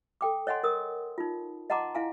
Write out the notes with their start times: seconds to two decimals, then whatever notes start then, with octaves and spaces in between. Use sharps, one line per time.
0.21 A4 G5 D6
0.47 C#5 D#5 F#5 G#5 C6
0.64 A#4 D#6
1.18 D#4 F4
1.70 D#5 F#5 A5 A#5 C6 D6
1.95 E4 F5 G#5